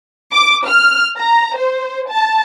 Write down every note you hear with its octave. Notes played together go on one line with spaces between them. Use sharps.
D6
F6
A#5
C5
A5